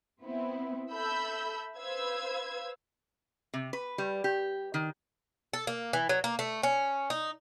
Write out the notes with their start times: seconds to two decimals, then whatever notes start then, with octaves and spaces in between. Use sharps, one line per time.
0.23 B3 C4 E4
0.91 A4 E5 B5 E6 G6
1.78 B4 C5 F5 E6 G#6
3.54 C3
3.73 B4
3.98 G3
4.24 G4
4.74 D#3
5.53 A4
5.67 A#3
5.93 E3
6.09 F#3
6.24 A#3
6.39 A3
6.63 C#4
7.10 D#4